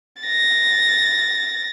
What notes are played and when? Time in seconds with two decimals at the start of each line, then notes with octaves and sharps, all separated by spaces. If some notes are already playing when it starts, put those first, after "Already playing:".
0.22 A6 A#6